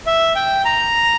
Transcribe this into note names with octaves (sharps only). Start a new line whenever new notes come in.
E5
G5
A#5